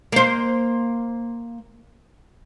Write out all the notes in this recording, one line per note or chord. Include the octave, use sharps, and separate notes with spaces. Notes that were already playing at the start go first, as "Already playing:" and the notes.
A#3 C5